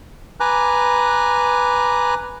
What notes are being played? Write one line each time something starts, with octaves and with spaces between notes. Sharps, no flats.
B4 G#5 A#5 D6 F#6